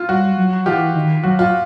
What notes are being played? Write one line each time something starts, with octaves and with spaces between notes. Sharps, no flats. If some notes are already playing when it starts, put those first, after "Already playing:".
Already playing: F4
G3 F#4
F#3
E3 F4 G4
D#3
F#3 F#4
F4